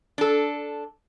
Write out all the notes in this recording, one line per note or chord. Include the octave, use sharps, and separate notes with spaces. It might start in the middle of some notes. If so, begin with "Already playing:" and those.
D4 A4